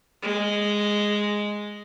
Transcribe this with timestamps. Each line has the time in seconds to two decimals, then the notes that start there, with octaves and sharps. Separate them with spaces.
0.22 G#3